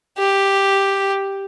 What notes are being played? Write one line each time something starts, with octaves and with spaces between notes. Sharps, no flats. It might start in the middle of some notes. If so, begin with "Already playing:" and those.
G4